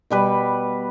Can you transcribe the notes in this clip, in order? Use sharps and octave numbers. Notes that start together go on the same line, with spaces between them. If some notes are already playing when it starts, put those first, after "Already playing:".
B2 G3 B4